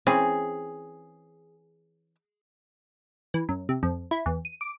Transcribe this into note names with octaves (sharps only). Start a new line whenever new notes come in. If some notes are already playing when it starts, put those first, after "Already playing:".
E3 C4 C#4 G#4
E3
F#2
C3
F2
E4
E2
D#7
D6